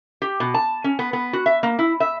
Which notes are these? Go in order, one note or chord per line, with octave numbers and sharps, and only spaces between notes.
G4
B2
A5
C#4
B3
B3
F#4
E5
A#3
E4
E5